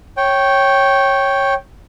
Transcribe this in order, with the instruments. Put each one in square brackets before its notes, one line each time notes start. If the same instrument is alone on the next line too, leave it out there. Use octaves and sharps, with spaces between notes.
[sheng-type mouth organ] C#5 G5